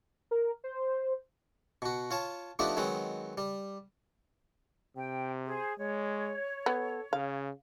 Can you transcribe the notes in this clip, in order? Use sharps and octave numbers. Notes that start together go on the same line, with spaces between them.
A#4
C5
B2 F#4
F4 C#5 A5
F3 A3 B3 D4 D#4 G4
D#3 F#3 G#3 B3 C4
G3
C3 G5
G#4 C5
G#3 C#5
B3 A4
C#3 F5